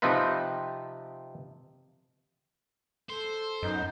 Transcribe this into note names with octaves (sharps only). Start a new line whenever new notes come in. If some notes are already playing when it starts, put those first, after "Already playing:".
C3 F3 C4 D#4 F4 B4
A4 C5
F#2 B3 D#4